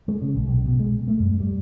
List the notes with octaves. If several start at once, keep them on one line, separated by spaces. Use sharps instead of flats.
G#3
C#3
A#1
B1
B2
G#3
A3
F#2
G3